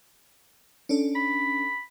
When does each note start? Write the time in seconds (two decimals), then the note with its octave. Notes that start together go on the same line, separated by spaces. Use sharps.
0.89 C#4 D4 A4
1.15 B5